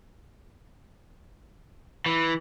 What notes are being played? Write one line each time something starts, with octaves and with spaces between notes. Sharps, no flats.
E3